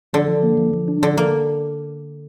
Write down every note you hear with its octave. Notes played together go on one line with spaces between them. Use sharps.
D3 F3
F3
A#3
F3
F3
D4
D3 F3
F3 A#3